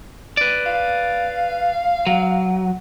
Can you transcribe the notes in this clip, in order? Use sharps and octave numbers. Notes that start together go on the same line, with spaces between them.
B4 D5
F5
F#3